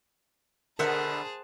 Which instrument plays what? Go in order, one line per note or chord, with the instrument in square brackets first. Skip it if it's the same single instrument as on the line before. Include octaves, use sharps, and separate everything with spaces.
[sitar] B2 D3 E5 [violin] G#4 A5 [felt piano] A#4 [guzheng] C5 F#5